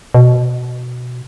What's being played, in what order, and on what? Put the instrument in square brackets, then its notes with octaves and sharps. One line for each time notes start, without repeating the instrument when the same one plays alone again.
[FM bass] B2